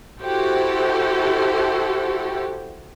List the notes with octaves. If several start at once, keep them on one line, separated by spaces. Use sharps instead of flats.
E4 F#4 G4 A4 C5